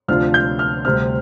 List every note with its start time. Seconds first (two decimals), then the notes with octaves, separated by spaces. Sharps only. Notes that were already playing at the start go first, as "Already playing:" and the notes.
0.08 D2 C3 F3 D4 F4 F6
0.34 G6
0.59 F6
0.85 D2 C3 G3 C4 F6